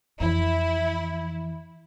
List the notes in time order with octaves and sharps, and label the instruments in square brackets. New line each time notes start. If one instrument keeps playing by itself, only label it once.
[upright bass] F2 E3 [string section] E4